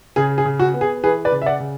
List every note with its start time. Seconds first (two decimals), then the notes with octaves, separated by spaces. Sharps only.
0.16 C#3 G#4
0.38 G#4
0.45 C#3
0.60 F#4
0.74 B3
0.81 G#4
1.04 E3 G#4 B4
1.25 B4 D5
1.32 C#3
1.42 E5
1.46 D5 F#5
1.60 C#3